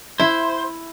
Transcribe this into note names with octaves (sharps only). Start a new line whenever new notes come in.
E4 C5